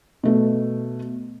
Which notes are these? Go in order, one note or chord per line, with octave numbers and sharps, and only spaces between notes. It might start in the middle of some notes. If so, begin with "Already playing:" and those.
B2 A3